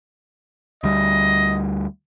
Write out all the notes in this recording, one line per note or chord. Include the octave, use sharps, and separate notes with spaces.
D2 G3 D#5